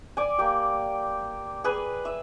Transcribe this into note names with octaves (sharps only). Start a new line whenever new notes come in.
D5 G#5
A#3 G4
G#4 B4 G#5
E5